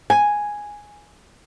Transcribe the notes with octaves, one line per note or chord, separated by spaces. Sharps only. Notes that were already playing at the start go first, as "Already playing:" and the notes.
G#5